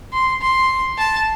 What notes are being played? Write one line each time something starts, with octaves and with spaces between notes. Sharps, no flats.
C6
C6
A5